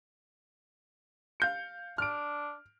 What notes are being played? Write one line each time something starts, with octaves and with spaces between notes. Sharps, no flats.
F5 G6 C#7
D4 F6 D7